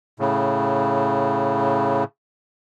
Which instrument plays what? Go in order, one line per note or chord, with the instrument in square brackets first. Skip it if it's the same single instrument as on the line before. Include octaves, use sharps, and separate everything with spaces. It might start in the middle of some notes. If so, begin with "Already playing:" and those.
[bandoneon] A2 C#3